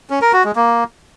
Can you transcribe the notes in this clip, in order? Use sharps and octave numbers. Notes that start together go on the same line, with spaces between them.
C#4
A#4
F#4
G#3
A#3